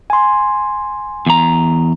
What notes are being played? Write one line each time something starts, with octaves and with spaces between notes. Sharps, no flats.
G#5 C6
E2 A#5